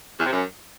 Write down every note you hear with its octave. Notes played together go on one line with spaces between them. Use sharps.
E2
C3
F#2